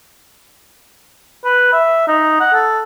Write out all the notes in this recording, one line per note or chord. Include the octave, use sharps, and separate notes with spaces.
B4
E5
D#4
F#5
A4